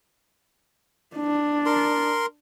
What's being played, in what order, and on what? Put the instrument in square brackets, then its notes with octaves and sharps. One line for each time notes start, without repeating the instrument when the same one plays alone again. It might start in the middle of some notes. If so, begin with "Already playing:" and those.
[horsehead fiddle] D4
[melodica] A#4 C6